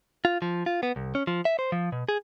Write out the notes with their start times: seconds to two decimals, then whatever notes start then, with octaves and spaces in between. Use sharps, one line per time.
0.25 F4
0.42 F3
0.66 F4
0.83 B3
0.96 C2
1.15 C#4
1.27 F3
1.45 E5
1.59 C5
1.72 F3
1.92 B2
2.09 G#4